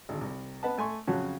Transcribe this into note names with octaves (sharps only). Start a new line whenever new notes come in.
G#1 D2
C2
B3 B4 D#5 F#5 A5
A3 G#5 C6 C#6
F2 C#3 F#3 F#4 C#5 A5